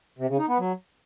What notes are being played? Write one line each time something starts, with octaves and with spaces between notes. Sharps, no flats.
C3
C#3
D#4
B3
F#3